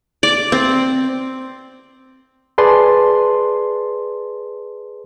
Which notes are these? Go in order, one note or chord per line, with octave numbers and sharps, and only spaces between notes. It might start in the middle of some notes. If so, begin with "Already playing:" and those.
D5
C4
G#4 B4 D5 A5 C6